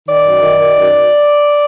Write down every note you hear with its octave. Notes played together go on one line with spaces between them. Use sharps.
D#3 D5
F#2
D#3
D#3
F#2